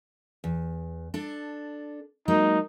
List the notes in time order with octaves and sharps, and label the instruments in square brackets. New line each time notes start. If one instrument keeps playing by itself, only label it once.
[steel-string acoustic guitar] E2
D4 A4
[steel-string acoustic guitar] F#3 G#3 A#3 [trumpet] D#4